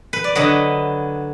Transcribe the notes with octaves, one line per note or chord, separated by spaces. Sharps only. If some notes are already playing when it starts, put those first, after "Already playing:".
B4
D5
D3 F#3 B4 D#5